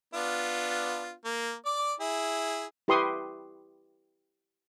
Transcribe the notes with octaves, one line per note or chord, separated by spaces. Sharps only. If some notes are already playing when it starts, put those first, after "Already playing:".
B3 D4 F4
A#3
D5 D6
E4 G#4
E4 G4 B4 C6 C#6 D#6